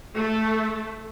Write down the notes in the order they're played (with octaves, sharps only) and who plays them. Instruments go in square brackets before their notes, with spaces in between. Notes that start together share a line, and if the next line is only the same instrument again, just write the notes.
[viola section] A3 A4